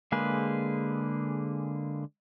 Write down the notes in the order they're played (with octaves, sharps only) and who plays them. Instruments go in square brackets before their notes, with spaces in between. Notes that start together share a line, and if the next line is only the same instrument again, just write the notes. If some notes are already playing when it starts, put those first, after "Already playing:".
[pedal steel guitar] D3 G#3 A#3 G#4 B4